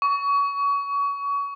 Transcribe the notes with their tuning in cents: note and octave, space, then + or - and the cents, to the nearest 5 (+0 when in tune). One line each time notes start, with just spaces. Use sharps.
C#6 +30